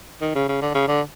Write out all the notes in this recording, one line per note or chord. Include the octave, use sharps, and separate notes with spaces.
D#3
C#3
C#3
D3
C#3
D3